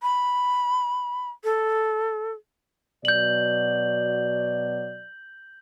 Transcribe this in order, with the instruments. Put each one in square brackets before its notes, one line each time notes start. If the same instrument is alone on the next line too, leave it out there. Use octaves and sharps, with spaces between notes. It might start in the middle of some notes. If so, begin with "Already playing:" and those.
[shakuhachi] B5
A4
[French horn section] B2 F#3 D5 [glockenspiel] G6 F#7